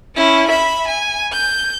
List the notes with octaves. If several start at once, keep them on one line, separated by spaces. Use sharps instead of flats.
C#4 E4
E5 B5
G#5
G6